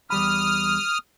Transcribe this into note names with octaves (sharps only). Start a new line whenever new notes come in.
E2 G3 B5 D#6 F6